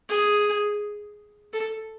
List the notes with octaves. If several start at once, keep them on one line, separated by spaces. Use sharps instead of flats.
G#4
A4